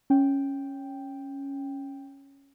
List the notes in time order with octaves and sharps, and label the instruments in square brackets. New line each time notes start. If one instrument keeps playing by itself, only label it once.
[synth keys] C#4 G5